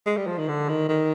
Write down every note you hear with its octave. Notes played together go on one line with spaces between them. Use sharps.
G#3
G3
F3
D#3
D3
D#3
D#3